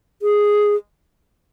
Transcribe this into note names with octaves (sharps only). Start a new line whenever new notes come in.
G#4